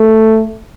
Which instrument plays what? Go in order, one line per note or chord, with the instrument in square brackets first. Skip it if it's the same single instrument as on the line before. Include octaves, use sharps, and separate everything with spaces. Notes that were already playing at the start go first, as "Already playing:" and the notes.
Already playing: [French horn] A3